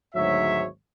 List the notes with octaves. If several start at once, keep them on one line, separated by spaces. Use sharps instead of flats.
G#1 D2 G#2 F#3 C#5 E5